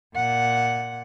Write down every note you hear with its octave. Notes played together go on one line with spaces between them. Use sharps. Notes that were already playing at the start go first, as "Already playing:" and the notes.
A#2 F#5